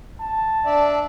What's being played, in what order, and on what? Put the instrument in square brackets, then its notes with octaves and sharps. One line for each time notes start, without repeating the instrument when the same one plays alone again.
[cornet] A5
[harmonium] D4 D5 E5